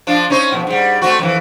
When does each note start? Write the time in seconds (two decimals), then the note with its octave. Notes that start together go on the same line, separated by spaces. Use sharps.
0.07 F3 D4 F4
0.30 C#4 D#4 C5
0.52 F2 G#2 B2
0.67 G#2 G3
1.02 A3 C4 F#4
1.19 F2 C3 E3